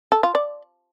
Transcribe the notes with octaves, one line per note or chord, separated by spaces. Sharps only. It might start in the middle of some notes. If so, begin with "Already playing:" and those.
A4
F4
D5